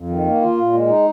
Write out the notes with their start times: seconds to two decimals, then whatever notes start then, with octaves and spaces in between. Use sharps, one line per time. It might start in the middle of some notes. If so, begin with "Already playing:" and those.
Already playing: F2
0.09 D#3
0.25 A#3
0.42 F4
0.58 A#2
0.73 G#3
0.89 D#4